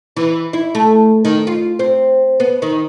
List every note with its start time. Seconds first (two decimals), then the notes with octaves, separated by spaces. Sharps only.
0.17 E3
0.53 E4
0.75 A3
1.25 D#3
1.47 F4
1.79 C4
2.40 B3
2.62 D#3